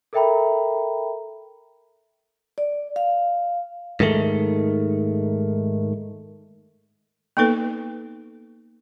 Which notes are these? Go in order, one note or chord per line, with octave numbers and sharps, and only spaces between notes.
A4 A#4 E5 G5 A#5 B5
D5
F5
G#2 D#3 A3
A#3 B3 D#4 A4 B4